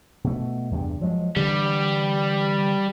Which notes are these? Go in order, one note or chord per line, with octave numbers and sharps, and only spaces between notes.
B2 A3
E2 G2 C3
F3 F#3 G#3
D3 E3 G3